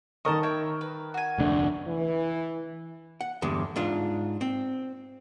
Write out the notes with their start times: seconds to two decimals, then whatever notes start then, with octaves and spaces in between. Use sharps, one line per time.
0.25 D#3 A#4 D#5 A5 C#6
0.43 E4 C#5 G5
0.81 B4
1.14 F#4 G#5
1.38 F1 D2 D4
1.88 E3
3.21 F#5
3.42 E2 G2 D3
3.76 G#2 D4 F4
4.41 C4